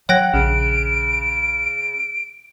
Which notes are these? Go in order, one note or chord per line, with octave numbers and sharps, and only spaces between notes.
F#3 C#5 F#5 G5 F#6 A#6
A#1 C#3 D7